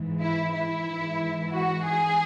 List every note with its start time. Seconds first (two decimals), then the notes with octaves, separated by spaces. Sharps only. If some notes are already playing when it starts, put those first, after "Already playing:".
Already playing: G#2 E3
0.22 E4
0.55 E4
0.87 G#2 E3
1.52 F#4
1.85 G#4